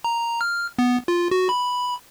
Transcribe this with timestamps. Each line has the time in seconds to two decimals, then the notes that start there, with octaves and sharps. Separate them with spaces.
0.04 A#5
0.41 F6
0.79 B3
1.08 F4
1.31 F#4
1.49 B5